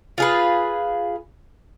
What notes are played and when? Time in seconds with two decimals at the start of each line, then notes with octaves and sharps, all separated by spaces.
0.18 F4 G#4 B4